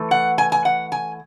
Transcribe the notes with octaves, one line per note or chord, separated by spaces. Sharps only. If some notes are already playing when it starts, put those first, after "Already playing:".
Already playing: E3 A3
F#5
G#5
G#5
F#5
G#5